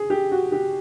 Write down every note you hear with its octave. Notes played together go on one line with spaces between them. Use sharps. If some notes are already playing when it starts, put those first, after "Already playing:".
Already playing: G#4
G4
F#4
G4